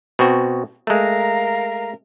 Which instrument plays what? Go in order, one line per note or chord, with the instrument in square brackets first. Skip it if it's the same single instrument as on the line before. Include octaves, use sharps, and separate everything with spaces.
[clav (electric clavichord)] B2 C4 F#4
[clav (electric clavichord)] G#3 A3 [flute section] A#4 F5 A#5